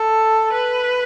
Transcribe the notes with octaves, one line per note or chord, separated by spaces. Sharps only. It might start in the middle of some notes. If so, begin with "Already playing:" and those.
Already playing: A4
B4